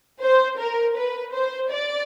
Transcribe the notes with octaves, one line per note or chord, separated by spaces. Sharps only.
C5
A#4
B4
C5
D5